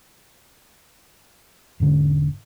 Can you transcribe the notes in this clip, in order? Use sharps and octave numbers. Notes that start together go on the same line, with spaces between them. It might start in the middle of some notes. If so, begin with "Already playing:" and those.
E1 G#2 D3 C#4